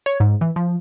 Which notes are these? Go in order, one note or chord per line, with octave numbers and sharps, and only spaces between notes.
C#5
G#2
E3
F3